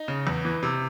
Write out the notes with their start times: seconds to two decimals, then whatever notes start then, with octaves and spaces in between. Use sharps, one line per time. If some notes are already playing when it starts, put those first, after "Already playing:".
Already playing: D#4
0.08 C#3
0.27 E2
0.45 E3
0.63 C3